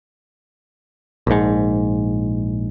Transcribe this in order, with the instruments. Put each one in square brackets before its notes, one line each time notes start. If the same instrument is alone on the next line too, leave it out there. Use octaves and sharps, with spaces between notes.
[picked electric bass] A#1 G#2